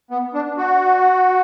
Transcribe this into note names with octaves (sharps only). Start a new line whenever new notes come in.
B3
D4
F#4